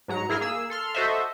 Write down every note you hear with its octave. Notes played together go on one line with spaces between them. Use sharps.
G#2 F#3 A#5 C#7
G#2 E4 G#4 A#4 F6 G6
A#3 G#4 E6
A4 C6 F6
F#4 A4 C5 D#5 E5